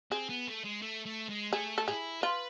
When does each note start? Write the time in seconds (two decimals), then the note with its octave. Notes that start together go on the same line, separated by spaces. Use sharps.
0.12 C4 G#4
0.29 B3
0.47 A3
0.64 G#3
0.82 A3
1.06 A3
1.29 G#3
1.52 A3 G#4
1.78 A4
1.88 E4 G#4
2.22 F4 B4